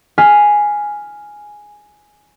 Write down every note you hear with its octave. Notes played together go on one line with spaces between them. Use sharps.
G#5 F6 B6 C7